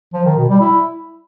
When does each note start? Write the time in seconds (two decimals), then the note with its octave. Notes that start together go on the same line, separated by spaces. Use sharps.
0.13 F3
0.25 D#3
0.37 B2
0.49 G3
0.61 E4